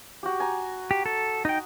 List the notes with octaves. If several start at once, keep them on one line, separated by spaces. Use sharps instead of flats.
F#4 G4
G#5 A#5
G4
A4
D#4 G5 D#6